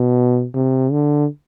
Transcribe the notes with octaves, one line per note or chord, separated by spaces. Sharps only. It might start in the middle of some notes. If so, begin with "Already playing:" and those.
Already playing: B2
C3
D3